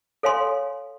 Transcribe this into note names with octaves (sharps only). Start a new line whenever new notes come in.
A4 C#5 F5 G#5 C6